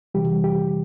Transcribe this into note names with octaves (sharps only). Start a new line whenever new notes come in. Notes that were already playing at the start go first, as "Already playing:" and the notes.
C3 E3 G3 G4
G4